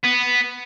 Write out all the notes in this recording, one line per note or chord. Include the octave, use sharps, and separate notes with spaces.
B3